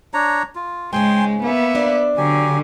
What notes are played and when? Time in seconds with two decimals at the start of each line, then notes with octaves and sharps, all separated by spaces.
0.14 D4 C#5 A#5
0.55 F4
0.93 G#2 C#3 G#3 C#4 G5 G#5 C6
1.43 A#3 B3 E5
1.75 D4 C5 D5
2.17 D3 F#3 G4 G#5